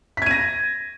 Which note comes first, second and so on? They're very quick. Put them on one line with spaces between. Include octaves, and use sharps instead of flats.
B6 G#6 D#7 A#6